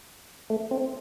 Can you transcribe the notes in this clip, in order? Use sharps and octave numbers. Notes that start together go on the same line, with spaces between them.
A3
C4